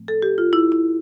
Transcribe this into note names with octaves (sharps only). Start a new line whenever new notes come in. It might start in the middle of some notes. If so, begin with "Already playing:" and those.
Already playing: A2 F3 A3 C4
A4
G4
F4
E4
E4